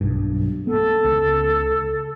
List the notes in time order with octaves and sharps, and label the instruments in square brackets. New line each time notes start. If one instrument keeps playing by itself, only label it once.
[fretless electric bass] B1 G2
[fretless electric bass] B3 [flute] A4
[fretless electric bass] C#2